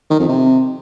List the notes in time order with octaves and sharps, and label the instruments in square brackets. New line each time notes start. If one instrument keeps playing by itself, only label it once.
[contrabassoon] D#3
F2
C3